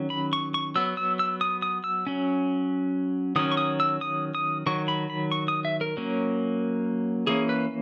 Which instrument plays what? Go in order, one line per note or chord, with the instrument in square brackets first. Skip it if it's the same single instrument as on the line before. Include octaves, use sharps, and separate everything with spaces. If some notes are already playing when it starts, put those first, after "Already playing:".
Already playing: [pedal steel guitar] D#3 F#3 C#4
B5
C#6
C#6
F#3 B3 E6
E6
E6
D#6
D#6
E6
F#3 C#4
D#3 F#3 C#4 D#6
C#6
D#6
E6
D#6
D#6
D#3 F#3 C#6
B5
B5
C#6
D#6
E5
A#4
F#3 A#3 C#4
E3 A#3 C#4 G#4
B4